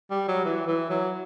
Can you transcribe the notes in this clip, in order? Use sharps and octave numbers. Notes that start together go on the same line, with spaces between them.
G3
F#3
E3
E3
F#3